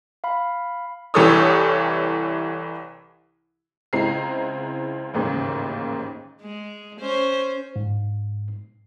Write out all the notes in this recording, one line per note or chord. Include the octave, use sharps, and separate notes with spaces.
F5 B5
C2 E3 G4 A4 C#5 D#6
C#2 G#3 C4 E4 A#5 C7
A1 D#2 G#2 C#3
G#3
C#4 C5
G#2